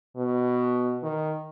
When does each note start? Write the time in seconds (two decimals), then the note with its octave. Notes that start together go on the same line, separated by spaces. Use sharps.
0.16 B2
1.03 D#3